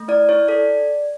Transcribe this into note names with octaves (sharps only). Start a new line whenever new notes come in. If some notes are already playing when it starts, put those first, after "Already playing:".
Already playing: A3
E4 D5
E4 C#5
A4 D5